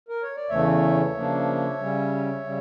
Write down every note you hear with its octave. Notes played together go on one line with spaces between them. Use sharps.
A#4
C#5
D5
E2 C#3 E3 A3 C#5 E5
C#3 F3 A#3 D4
C#3 G3 C#4
C#3 G3